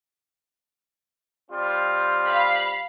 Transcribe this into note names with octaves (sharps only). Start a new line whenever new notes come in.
G3 C4 F4
F5 B5